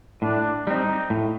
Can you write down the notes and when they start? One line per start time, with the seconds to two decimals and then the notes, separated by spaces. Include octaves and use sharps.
0.22 A2 D4
0.67 G3 C4 D#4
1.10 A2